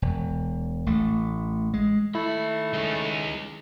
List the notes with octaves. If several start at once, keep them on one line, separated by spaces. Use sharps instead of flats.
E1
A1 A3
G#3
D#3 A3 E4 B5
G#3 C#4